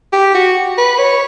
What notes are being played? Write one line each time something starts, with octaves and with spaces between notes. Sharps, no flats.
G4
F#4
B4
C#5